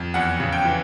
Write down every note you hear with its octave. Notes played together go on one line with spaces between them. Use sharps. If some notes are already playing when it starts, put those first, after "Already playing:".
Already playing: F2
E2 F#5
C#3
G5
E3